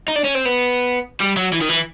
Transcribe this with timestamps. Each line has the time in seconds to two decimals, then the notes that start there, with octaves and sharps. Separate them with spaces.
0.08 D#4
0.16 D4
0.24 C#4
0.35 C4
0.46 B3
1.21 G3
1.37 F#3
1.53 E3
1.61 D#3
1.69 E3